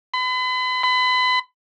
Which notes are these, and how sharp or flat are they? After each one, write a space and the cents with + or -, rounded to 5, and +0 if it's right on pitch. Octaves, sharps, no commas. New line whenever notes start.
B5 +40
B5 +35